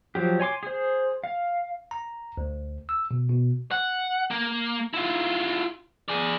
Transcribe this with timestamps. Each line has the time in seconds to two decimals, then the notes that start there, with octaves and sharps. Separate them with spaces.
0.15 F3 F#3 G4
0.40 C#5 G#5 C6 D6
0.63 G#4 C5
1.24 F5
1.91 A#5
2.37 D2
2.89 E6
3.11 B2
3.29 B2
3.71 F#5
4.31 A#3
4.94 E4 F4
6.08 G#4 D5